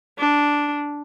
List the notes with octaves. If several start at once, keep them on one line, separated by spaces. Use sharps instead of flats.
D4